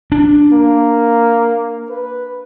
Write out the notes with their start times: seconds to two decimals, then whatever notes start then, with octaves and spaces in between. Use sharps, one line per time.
0.12 D4
0.52 A#3
1.90 B4